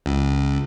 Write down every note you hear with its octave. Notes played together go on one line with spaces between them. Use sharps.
C#2